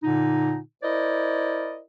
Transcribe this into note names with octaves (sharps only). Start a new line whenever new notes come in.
A#2 D3 D#4
E4 A#4 C5 D5 D#5